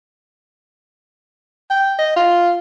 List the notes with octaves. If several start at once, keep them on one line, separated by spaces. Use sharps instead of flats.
G5
D#5
F4